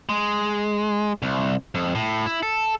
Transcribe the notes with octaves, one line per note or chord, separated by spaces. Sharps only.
G#3
C2
F2
A2
E4
A4